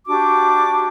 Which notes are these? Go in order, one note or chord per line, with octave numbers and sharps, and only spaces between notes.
D4 F#4 G4 D6